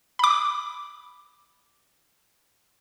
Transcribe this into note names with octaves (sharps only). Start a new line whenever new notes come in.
B5 D6